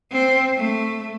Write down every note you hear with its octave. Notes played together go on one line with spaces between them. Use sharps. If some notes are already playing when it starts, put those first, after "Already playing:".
C4
A3